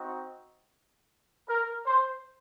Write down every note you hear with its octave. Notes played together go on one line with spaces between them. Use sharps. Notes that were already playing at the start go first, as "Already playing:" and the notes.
Already playing: C4 D#4 F#4
A#4
C5